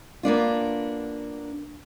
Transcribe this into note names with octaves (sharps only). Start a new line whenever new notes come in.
A#3 B3 D4 F4